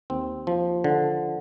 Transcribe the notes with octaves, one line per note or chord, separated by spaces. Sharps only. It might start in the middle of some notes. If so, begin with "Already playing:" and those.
D#2 C4
F3
D3